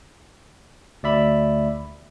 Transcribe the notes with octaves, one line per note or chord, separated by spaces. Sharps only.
D2 D5 E5 B5